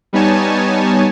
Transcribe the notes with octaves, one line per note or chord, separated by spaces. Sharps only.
G3 B3 D#4 C#5 G#5 A5